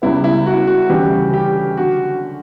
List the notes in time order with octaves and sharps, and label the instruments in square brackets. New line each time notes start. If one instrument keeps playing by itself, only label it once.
[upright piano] C#2 C#3 G3 B3 [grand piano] E4
[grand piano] E4
F#4
F#4
[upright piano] D2 C#3 E3 G3 [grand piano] G4
[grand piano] G4
[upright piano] D3 F#3 [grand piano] F#4